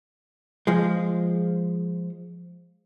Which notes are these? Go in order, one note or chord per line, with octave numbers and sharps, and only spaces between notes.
F3 G#3